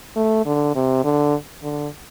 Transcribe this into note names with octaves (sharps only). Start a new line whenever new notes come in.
A3
D3
C3
D3
D3